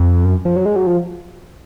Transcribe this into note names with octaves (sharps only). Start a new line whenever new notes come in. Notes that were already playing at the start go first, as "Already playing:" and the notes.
Already playing: F2
F#2
F3
F#3
G#3
F#3
F3